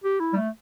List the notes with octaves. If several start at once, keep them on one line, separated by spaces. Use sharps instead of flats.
G4
E4
G3
A3